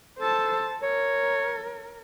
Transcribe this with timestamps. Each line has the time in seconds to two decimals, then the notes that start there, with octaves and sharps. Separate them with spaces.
0.19 A4 C5 A5
0.82 A#4 C#5